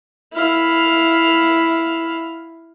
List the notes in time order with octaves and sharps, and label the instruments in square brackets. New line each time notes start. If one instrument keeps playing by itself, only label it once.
[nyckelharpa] E4 F5